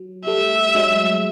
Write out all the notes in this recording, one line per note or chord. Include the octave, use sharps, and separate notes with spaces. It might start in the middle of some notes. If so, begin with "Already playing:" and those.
Already playing: F#3
G3 A3 E5
F#3 G#3